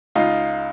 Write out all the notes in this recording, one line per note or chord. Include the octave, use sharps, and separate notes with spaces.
C#2 D#4 F4